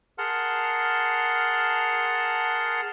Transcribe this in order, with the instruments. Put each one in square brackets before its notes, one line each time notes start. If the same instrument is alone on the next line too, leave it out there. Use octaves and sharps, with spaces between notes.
[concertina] G#4 A#4 F#5 A5 C6 F6